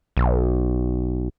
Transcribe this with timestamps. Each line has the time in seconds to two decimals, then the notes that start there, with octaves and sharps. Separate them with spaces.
0.17 B1